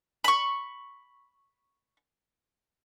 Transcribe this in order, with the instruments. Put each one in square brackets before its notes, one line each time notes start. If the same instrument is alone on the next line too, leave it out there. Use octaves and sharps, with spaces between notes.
[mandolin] B5 C#6